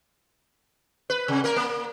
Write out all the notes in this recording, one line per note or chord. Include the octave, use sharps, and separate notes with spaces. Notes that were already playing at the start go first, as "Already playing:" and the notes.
B4
C3
A#3 A#4
A#3